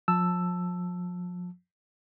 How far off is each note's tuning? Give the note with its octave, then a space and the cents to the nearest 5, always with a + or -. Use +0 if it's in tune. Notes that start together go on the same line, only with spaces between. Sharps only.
F3 +35 A5 +0 E6 +5